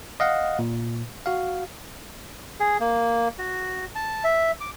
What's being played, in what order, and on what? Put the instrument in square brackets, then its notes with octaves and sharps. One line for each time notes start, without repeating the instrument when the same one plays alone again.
[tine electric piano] D#5 F5 F#5
A#2
F#4 F5
[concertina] G#4
A#3
F#4
A5
E5
D6